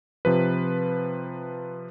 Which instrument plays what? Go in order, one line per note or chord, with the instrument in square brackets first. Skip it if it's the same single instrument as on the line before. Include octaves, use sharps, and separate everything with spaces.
[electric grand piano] C3 F3 B4